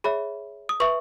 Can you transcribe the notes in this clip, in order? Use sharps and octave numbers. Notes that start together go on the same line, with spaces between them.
G#4 C#5 E5 B5
D#6
B4 E5 C#6